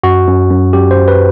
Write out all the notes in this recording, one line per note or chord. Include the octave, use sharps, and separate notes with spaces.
F#2 F#4
F#2
F#2
F#2 G4
C5
F#2
B4